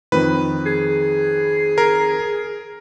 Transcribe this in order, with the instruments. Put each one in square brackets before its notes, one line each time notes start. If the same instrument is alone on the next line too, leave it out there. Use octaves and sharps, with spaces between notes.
[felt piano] F2 D#3 [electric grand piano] B4
[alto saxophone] G#4
[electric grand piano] A#4